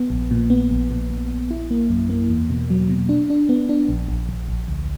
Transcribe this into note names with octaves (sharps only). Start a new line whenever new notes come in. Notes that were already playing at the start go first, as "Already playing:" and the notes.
Already playing: B3
A#1
A#2
B3
A#1
A#2
A#1
A#1
E4
A#3
F#2
A#3
E2
B2
F#3
B2
D4
D4
B3
D4
A#1
A#1
A#1
A#1
D2